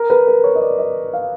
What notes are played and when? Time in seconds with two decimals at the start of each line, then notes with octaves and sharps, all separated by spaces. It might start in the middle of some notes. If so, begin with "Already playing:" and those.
Already playing: A#4
0.10 B4
0.27 A#4
0.44 C#5
0.55 D#5
0.61 D5
0.79 D#5
1.13 F5